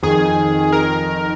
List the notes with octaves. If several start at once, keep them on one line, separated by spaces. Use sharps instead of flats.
F2 D#3 G#4
A#4